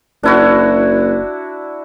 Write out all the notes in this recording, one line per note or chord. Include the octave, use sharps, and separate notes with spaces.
F#1 D4 E4 F#4